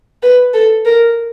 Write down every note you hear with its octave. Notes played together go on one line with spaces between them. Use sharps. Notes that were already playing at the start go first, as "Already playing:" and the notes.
B4
A4
A#4